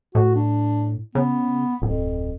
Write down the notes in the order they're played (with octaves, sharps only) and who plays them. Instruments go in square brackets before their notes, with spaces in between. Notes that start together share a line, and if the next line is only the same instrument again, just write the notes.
[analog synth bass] A2 [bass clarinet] F#4
[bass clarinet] D4
[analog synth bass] C#3 [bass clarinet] B3
[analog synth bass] D1 [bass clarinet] F2